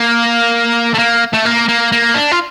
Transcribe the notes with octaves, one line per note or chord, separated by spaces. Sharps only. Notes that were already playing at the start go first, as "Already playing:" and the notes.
Already playing: A#3
A3
A#3
A3
A#3
A#3
A#3
D4
F4